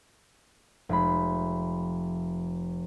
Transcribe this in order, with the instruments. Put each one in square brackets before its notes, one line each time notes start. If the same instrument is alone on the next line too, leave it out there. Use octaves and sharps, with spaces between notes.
[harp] F1 G#3 B5